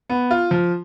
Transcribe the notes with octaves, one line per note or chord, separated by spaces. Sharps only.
B3
F4
F3